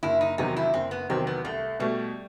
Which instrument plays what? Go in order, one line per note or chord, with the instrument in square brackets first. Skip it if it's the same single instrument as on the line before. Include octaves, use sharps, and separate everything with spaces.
[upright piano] F#1 [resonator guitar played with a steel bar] E4
[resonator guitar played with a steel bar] D#4
[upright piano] E2 C3 D#3 F#3 [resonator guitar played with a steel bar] D#4
[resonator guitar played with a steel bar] E4
[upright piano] F#1 [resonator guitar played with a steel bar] C4
[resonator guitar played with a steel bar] B3
[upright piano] E2 C3 D#3 F#3 [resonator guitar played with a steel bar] C4
[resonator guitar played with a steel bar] B3
[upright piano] C2 [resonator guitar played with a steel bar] A3
[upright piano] B2 A3 [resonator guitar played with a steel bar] G3